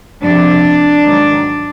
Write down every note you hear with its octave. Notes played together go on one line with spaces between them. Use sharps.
F2 C3 F3 D4
G#2 D#3 F#3